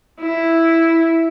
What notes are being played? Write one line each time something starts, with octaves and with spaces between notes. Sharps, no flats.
E4